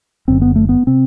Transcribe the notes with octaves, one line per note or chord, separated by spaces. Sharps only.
F#1 F#2 D3 C4
B3
A3
B3
C3 C4